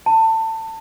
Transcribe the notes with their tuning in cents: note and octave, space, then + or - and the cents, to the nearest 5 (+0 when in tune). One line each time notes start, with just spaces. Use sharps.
A5 +25